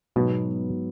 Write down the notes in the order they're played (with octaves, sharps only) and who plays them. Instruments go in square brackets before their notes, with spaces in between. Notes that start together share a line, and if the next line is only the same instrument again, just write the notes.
[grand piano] G#2 F#3 B3 [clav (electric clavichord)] B2